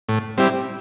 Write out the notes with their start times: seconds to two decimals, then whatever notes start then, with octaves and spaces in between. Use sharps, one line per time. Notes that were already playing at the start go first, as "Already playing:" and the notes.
0.09 A2
0.38 G3 C4 E4 G4